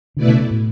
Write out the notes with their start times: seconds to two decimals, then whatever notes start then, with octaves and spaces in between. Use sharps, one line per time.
0.16 B2 D3 A3 E4 B4 D5
0.28 C#3
0.40 B2
0.51 A2